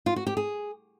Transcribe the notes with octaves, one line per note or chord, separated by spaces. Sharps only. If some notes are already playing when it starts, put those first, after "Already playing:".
F4
F#4
G4
G#4